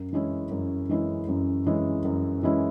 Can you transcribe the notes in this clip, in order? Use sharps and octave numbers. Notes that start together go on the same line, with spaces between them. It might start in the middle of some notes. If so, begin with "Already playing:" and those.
Already playing: F#2
E3 G#3 C#4 E4
F#2
E3 G#3 C#4 E4
F#2
E3 G#3 C#4 E4
F#2
E3 G#3 C#4 E4